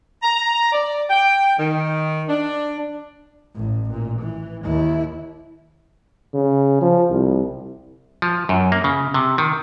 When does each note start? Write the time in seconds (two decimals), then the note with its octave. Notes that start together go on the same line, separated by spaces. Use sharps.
0.22 A#5
0.73 D5
1.09 G5
1.58 D#3
2.29 D4
3.55 A1 A2
3.91 A#2
4.20 E3
4.64 D#2 E4
6.34 C#3
6.81 F3
7.10 C2
8.22 F3
8.49 F#2
8.72 A#3
8.84 C#3
9.14 C3
9.38 D#3